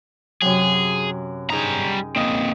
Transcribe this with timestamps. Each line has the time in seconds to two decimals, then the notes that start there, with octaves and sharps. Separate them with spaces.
0.42 F#2 C3 F#3 G#4
1.50 G3 D#4 G#4 A#5
2.16 A#3 C4 D#5